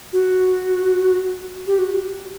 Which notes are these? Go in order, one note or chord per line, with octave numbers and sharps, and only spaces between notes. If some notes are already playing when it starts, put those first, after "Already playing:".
F#4
G4
F#4